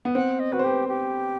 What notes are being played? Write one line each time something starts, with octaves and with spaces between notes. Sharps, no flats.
B3
C4 F#5
D#5
F#4 B4
C5
G4 B4
G4